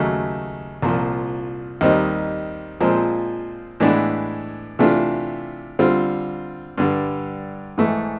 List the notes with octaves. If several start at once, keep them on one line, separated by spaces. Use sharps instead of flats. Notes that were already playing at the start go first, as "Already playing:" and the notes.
Already playing: D#2 C#3 F#3 A3
C2 A#2 F3
D#2 D#3 G3 C4 D#4
A#2 F3 G#3 C4
A2 E3 G#3 B3 D4
C3 E3 A3 D4 F4
D3 G3 C4 F4
G2 D3 G3
G#2 E3 A3